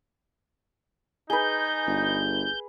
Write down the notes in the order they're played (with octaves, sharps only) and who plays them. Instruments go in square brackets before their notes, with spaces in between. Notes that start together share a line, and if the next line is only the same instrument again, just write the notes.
[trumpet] D#4 [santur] G#4 B4 [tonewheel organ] G6
[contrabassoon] G1